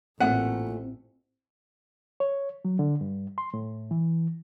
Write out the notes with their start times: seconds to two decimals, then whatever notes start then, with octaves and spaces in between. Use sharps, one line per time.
0.20 A1 A#2 A3 C4 F#5
2.20 C#5
2.65 F#3
2.79 D3
3.01 G2
3.38 C6
3.54 A2
3.91 E3